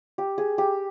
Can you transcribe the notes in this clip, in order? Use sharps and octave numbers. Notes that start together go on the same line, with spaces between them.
G4
G#4
G4